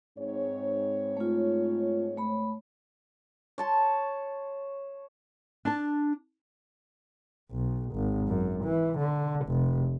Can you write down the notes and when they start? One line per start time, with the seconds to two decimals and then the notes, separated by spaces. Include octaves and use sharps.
0.18 G#2 C4 C#5
1.17 A3 F4
2.17 A3 B5
3.58 C#5 A5 C6
5.65 D4 A5
7.51 B1
7.94 G#1
8.28 F#2
8.64 E3
8.98 D3
9.46 F1